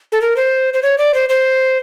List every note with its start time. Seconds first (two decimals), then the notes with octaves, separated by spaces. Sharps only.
0.12 A4
0.22 A#4
0.36 C5
0.74 C5
0.83 C#5
0.98 D5
1.14 C5
1.29 C5